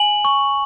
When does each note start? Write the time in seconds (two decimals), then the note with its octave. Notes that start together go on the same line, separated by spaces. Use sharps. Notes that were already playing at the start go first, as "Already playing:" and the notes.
Already playing: G#5 F#7
0.25 C#6